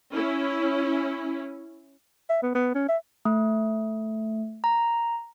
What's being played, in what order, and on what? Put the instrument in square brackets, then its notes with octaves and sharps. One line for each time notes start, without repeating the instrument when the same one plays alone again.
[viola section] C#4 E4
[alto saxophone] E5
B3
B3
C#4
E5
[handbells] A3
A#5